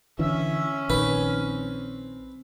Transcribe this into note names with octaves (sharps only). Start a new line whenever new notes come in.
D3 E3 C#4 E5
A#1 D#3 C4 B4